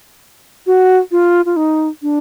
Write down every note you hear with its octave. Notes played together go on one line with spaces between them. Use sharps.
F#4
F4
F4
D#4
D4